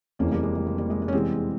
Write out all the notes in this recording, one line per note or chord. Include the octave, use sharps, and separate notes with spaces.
F1 F2 C#3 E3 A#3 C#4
G3 A#3
G#3
G#3
G#3
G3 A#3
G#3
G#3
C#4
E2 C3 E3 G3 G#3 C4